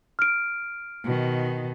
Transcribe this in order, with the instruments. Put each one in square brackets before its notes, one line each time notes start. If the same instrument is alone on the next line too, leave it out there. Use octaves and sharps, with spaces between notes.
[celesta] F6 D7
[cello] B2 D#3